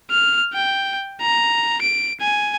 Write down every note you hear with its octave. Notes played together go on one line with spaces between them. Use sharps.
F6
G5
A#5
D7
G#5